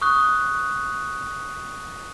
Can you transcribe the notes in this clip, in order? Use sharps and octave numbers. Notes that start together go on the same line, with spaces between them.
C#6 D#6 F#6